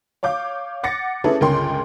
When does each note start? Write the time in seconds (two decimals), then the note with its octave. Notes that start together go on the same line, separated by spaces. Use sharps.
0.23 C#5 F5 D6 G6
0.83 F#5 D6 A6 A#6 C#7
1.24 C#4 E4 G#4 A4 B4
1.41 G1 C#2 C#4 A#4 G5 C6